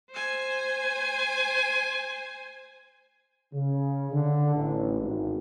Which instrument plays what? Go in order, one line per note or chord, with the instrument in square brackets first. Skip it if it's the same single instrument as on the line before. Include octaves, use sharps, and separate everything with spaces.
[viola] C5 G#5
[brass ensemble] C#3
D3
A1
G#1